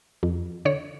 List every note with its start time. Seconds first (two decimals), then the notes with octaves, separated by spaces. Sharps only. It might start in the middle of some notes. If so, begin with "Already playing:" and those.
0.23 F2
0.65 D3 C#5